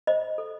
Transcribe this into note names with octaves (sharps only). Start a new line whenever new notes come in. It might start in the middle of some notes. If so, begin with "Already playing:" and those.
C5 D#5
A4